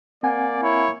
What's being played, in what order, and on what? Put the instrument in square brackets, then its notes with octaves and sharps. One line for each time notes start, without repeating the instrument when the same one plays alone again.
[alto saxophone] A#3 [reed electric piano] C4 F#5 G#5 [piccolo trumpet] D5
[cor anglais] E4 [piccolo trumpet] C#5